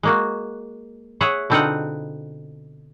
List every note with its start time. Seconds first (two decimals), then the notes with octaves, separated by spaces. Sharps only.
0.03 G#3 A#3 F#4
1.21 G#4 C#5 E5 F#5
1.50 B2 D3 C4 D#4 F4 F#5